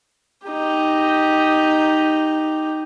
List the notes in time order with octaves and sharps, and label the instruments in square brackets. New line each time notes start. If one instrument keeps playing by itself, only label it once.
[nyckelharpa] D#4 G4